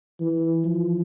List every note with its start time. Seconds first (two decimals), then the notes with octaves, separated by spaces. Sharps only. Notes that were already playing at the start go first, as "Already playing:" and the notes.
0.20 E3
0.64 F3